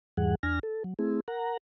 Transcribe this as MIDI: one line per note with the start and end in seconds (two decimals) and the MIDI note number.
0.17 0.35 40
0.17 0.35 44
0.17 0.35 52
0.17 0.35 55
0.17 0.35 68
0.17 0.35 78
0.43 0.59 40
0.43 0.59 62
0.43 0.59 80
0.43 0.59 89
0.43 0.59 94
0.63 0.83 69
0.84 0.94 54
0.99 1.20 57
0.99 1.20 60
0.99 1.20 64
0.99 1.20 68
1.28 1.57 70
1.28 1.57 78
1.28 1.57 82